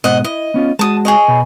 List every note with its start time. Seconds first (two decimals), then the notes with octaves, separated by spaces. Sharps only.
0.04 G#2 B2 C5 D#5 F#5
0.24 E4 D#5
0.54 B3 C#4 F4
0.79 G#3 F#4 A5 D#6
1.05 G#4 C#5 D#5
1.28 B2 B5